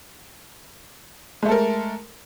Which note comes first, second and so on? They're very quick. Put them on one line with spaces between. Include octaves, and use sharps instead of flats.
G#3 A3 A4 A#4